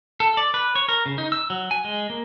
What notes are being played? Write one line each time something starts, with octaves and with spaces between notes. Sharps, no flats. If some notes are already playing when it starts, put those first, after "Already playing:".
A4
D5
B4
C#5
A#4
C#3
D#4
E6
F#3
G#5
G#3
A#3